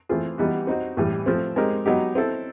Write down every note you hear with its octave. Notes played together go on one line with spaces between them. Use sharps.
E3 A3 C4 F4 G#4
E3 G3 B3 D#4 F#4
C4 D#4 F#4
A2 E3 G3
F3 A3 C4
G#3 C4 D#4 G4 A#4
F#3 B3 D#4 G4
C4 E4 A4